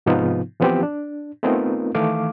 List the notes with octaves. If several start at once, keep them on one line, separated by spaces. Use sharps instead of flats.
G#2 C3 F3 B3 D#4 F4
E3 F3 B3 C4 F4 G4
D4
A3 B3 C4 D#4 F4 A#4
D#3 E3 A3 F5 D6